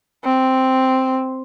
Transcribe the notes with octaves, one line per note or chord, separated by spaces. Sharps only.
C4